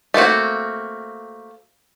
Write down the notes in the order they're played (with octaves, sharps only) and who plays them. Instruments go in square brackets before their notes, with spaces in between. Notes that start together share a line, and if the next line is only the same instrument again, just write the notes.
[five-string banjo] A3 A#3 C4 F#4